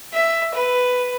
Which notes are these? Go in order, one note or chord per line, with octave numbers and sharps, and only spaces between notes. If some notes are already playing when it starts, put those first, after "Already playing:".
E5
B4